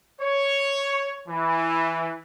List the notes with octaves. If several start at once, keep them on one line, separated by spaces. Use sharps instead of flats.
C#5
E3